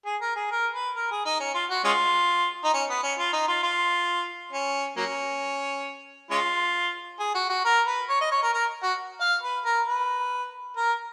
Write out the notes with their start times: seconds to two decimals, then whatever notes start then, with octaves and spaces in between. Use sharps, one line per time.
0.06 G#4
0.21 A#4
0.36 G#4
0.51 A#4
0.74 B4
0.95 A#4
1.11 G#4
1.25 D#4
1.40 C#4
1.54 F4
1.70 F#4
1.84 G#3 C#4 F4
2.64 D#4
2.74 C#4
2.89 B3
3.03 C#4
3.19 F4
3.33 D#4
3.48 F4
3.63 F4
4.53 C#4
4.96 F#3 A#3 C#4
6.31 G#3 C#4 F4
7.19 G#4
7.35 F#4
7.49 F#4
7.65 A#4
7.87 B4
8.09 C#5
8.20 D#5
8.32 C#5
8.42 A#4
8.53 A#4
8.83 F#4
9.21 F5
9.43 B4
9.65 A#4
9.88 B4
10.77 A#4